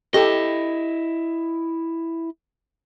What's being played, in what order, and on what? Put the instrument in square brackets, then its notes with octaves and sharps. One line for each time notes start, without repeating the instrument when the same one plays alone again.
[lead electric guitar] E4 D#5 [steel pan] G4 A4